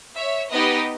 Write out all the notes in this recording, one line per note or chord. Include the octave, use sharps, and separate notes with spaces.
C#5 E5
B3 D#4 G4 B4 D#5